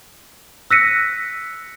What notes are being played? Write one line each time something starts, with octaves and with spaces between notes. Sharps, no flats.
E6 F#6 A#6 B6 C#7 D#7